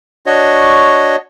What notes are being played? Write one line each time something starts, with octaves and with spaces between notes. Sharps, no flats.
D4 F#4 C#5 D#5